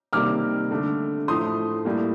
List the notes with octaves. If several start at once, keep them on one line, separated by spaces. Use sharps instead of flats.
C3 D#3 G3 A#3 D6 F6
D3 A3
A2 F3 A3 C6 D#6
A2 G3 A#3